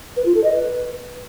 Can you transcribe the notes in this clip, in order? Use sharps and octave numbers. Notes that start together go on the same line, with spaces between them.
B4
F4
A4
D#5
B4